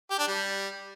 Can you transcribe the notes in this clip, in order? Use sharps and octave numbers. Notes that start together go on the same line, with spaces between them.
G4
D4
G3